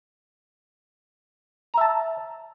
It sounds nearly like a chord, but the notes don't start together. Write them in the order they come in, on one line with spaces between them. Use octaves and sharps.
A#5 E5 A5